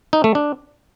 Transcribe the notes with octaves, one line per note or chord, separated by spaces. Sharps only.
D#4
A3
D4